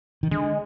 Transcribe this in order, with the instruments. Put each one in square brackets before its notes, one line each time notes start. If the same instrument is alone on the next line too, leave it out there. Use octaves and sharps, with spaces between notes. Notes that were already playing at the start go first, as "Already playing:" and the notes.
[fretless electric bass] D#3
[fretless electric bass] D3 [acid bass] G#3